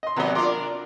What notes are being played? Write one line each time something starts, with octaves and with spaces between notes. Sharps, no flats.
D#5 C6
D#2 C3 F#3 B3 D#5
D4 F4 A#4 C6 D6